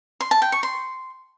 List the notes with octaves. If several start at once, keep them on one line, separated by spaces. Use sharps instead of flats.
C6
A5
G5
C#6
C6